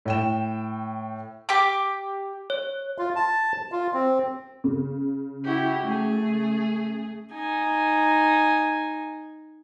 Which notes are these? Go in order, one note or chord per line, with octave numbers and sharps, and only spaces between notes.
A2 G5 E7
G4 D6
C#5
F4
A5
F4
C4
C#3
E4 F#4 G4
A3 G#4
D#4 G#5